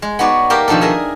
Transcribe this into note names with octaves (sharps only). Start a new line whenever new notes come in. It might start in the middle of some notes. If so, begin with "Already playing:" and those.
G#3
B3 D#4 F#4 C#5 D5
A#3 G4 A#4 G5 A5 A#5
B2 D#3 F3 D4 D#4 A4
G#4 A#4 D#5 E5